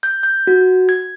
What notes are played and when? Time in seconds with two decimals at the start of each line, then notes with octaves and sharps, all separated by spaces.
0.03 G6
0.23 G6
0.47 F#4
0.89 G#6